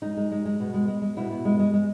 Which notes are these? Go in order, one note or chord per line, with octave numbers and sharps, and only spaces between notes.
G#3 D#4
G#3
G#3
G#3
B2
G#3
G#3
G#3
B2 E4
B2
G#3
G#3
G#3